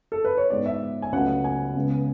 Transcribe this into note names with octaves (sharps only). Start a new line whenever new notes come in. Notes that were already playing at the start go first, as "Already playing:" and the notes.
A4
B4
C#5
G#2 G#3 B3 D5
E5
G#5
C#2 C#3 F#3 A3 F#5
G#5
C#2 C#3 G#3 B3